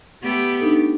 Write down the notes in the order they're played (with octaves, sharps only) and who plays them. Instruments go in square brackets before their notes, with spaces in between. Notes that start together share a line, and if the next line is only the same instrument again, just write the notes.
[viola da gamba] A3 B3 G4
[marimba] D4 D#4 A4